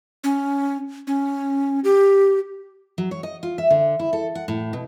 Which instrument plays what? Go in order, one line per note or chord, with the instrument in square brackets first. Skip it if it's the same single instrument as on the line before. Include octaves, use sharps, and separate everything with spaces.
[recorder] C#4
C#4
G4
[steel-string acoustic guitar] F#3
C#5
D#5
F4
E5
D3
E4
A4
F#5
A2
B2